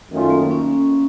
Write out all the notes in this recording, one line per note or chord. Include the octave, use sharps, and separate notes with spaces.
F#2 D#3 A3 C#4 F4
A#3
C#4